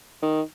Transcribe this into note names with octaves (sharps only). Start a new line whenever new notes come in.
D#3